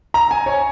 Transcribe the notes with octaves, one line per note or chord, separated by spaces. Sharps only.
A#5
G#5
C#5